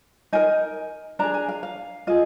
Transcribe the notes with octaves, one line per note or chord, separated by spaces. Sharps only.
D#4 A#4 G#5
D4 G#4 A#5
G#5
F5
F5
F4 G#4 D#5